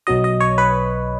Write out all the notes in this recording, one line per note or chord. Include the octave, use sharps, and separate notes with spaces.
B1 B2 F#3 D#5
D#5
C#5
B4